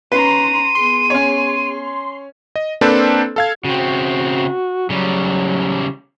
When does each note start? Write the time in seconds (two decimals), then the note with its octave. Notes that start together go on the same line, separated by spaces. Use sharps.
0.12 C#4 B4 A#5 C6 D#7
0.75 B3 G#4 C6
1.10 C#4 C#5
2.56 D#5
2.81 A#3 C4 D4 A4 B4 C5
3.36 A4 F5 G#6
3.65 C#3 C4 F#4
4.90 C#3 F#3 G3